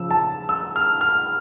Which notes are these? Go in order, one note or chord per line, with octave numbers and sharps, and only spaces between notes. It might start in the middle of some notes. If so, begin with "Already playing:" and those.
Already playing: C#3 F3 E6
A5
E6
F6
F6